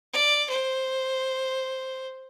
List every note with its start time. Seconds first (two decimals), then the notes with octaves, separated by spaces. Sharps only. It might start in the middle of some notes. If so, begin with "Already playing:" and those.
0.13 D5
0.49 C5